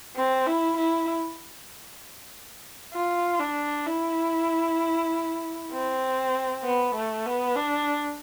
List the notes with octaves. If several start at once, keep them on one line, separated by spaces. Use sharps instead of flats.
C4
E4
E4
F4
D4
E4
C4
B3
A3
B3
D4